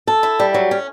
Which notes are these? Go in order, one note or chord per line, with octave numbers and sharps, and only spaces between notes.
A4
E4
G3
F#3
C#4